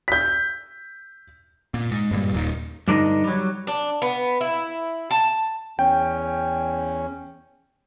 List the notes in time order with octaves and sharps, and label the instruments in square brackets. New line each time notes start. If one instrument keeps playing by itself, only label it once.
[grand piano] G6 B6
[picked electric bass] A#2
G#2
G2 A#2 G3
D#1 D#2 A#2 D#3
[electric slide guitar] G2 D3 D4 D#4 D#5
F#3 G3
[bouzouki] D4
B3
E4
A5
[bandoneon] E2 C#4 [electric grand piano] G5